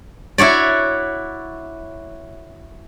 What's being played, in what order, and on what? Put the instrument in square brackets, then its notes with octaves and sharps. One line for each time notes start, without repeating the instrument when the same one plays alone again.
[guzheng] E4 F#4 C#5 D5